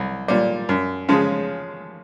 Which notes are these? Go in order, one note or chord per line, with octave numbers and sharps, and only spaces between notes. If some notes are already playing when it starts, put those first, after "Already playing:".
Already playing: C2
A#2 G3
F#2
C#3 F3 G#3